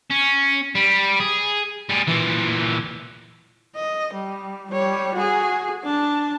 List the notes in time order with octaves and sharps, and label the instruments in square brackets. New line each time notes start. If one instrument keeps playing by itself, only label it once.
[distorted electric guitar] C#4
G3
G#4
G3 G#4
A#2 E3
[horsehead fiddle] D#5
G3
G3 C#5
F#4 G#4
D4 A5